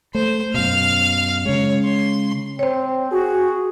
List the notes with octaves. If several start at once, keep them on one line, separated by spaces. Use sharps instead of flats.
A3 C5
F#2 B2 F5 F6
C#3 G#3 C#5
C6
C4 C5 C#5
F#4 G#4